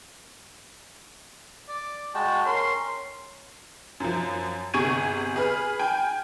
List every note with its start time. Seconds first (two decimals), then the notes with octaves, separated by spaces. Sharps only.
1.69 D5
2.15 G#3 F#4 G5 A5
2.45 C#4 A#4 C6
4.00 F#2 F3
4.74 G1 C3 G#4 C#6 G#6 D#7
5.36 G#4 B4 F6
5.79 G5 G#5